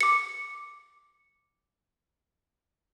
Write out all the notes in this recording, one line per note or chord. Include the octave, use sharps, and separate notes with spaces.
D6 C#7